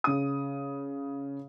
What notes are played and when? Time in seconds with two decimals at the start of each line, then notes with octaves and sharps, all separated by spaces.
0.04 C#3 D#6